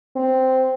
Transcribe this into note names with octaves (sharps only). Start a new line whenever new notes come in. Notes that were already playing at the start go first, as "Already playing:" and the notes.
C4